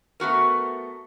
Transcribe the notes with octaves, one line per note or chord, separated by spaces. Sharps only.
A3 B3 F#4 A#4